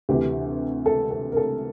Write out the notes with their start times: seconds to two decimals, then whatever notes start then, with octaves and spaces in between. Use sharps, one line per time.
0.09 D2 C3 E3 G4
0.86 A4
1.11 A4
1.32 A#4
1.37 A4